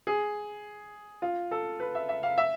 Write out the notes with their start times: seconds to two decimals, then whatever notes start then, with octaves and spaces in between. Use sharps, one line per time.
0.07 G#4
1.22 F4
1.51 A4
1.80 B4
1.95 E5
2.09 E5
2.23 F5
2.38 E5